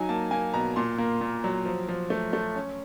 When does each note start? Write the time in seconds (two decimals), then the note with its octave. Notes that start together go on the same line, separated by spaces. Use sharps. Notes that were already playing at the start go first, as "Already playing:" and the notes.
Already playing: F#3 D#4 G#5
0.09 A#3 A5
0.31 A#3 G#5
0.54 B2 A#5
0.76 A#2 C6
0.98 A#3
1.21 A#2
1.44 F#3
1.65 F3
1.88 F3
2.10 A3
2.33 A3
2.55 C#4